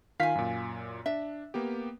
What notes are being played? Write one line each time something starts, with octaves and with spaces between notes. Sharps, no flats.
D#3 F4 F5 G#5 B6
F#2 A#2
D4 E5
A#3 B3 G4